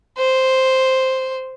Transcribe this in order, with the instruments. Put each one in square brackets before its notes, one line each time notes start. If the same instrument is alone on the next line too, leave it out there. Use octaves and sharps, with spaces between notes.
[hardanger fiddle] C5